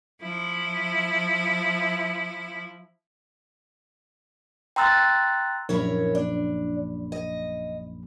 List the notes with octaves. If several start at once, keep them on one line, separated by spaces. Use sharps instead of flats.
F3 E4
G5 A#5 C6 E6 F#6 A6
A#1 F#2 E4 A#4 C#5 B5
D4
D#5